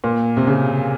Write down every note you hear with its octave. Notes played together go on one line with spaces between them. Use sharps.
A#2
C3
C#3